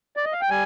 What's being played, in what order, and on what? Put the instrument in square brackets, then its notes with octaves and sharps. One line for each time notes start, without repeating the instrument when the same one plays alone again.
[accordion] D5
D#5
F5
G5
G3 G#5